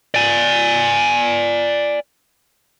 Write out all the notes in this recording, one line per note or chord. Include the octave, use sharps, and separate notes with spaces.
D5 G#5